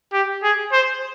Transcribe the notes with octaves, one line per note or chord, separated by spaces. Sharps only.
G4
G#4
C5